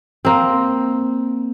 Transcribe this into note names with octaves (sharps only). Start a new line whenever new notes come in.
A#3 C4